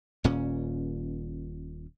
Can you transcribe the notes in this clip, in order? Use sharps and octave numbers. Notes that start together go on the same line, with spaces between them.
D#1 A#2 C#4